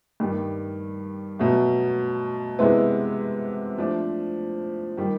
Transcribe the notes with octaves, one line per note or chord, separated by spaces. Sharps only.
G2 D#3 G3
B2 F#3 A3
C3 E3 G#3 B3 E4
F3 A3 D4
D#3 G3